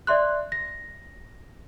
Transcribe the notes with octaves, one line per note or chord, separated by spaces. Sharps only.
D5 E5 C6 F#6
A#6